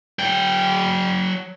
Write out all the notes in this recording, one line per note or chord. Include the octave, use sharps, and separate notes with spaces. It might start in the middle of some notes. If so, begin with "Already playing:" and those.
F#3 G5